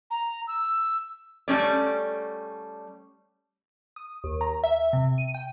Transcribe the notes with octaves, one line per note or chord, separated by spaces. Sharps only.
A#5
E6
G3 A3 C#4 D5
D#6
D#2
A#5
E5
C3
D#7
G5